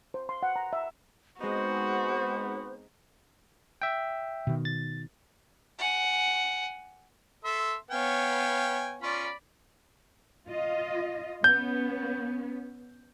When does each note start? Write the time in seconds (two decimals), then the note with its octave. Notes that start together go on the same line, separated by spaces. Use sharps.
0.14 C5
0.29 C6
0.43 F#5
0.56 A#5
0.73 E5
1.41 G#3 B3 C4 D#4 F#4 C5
3.82 E5 G5
4.47 B2 D#3
4.65 A6
5.79 F#5 G#5
7.44 A4 E5 C6
7.91 B3 C#5 F5 G5 G#5
9.02 C#4 F4 D5 B5
10.49 F4 D#5
11.44 B3 C#4 G6